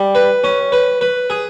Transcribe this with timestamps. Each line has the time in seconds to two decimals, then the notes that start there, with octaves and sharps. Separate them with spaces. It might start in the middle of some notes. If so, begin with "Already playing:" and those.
Already playing: G3
0.15 B4
0.44 C#4
0.72 B4
1.01 B4
1.30 G#4